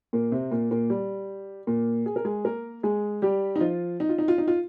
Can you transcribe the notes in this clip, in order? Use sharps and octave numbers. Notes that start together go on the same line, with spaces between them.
A#2 A#3
C3 C4
A#2 A#3
A#2 A#3
G3
A#2 A#3
G#4
A#4
G#3 G#4
A#3 A#4
G#3 G#4
G3 G4
D#4
F3 F4
D#4
F4
D#4
F4
D#4
F4